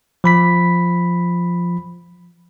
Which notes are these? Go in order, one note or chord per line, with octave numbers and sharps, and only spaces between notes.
F3 B5 B6